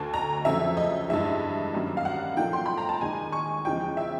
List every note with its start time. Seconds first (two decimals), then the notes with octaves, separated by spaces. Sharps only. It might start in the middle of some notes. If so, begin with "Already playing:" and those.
Already playing: D2 D3 A5
0.14 A#5
0.45 F2 C#3 F#3 A3 E5
0.77 D#5
1.09 G2 E3 G#3 E5
1.74 F#2 D#3 G3 A#3
1.97 F5
2.05 F#5
2.37 A#2 F3 A3 G5
2.53 C6
2.66 B5
2.77 A#5
2.89 A5
3.01 D#2 D#3 G#3 G#5
3.32 C#6
3.65 E2 C#3 F3 G#3 G5
3.97 E5